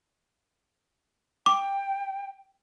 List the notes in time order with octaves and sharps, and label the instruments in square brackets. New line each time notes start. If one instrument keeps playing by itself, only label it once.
[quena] G5 [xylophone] D6